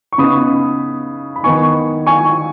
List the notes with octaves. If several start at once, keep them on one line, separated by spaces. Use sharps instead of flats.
C#6
C#3 B3 D#4 B5 D#6
B5
D#3 B3 D#4 G#5 C#6
G#5 C#6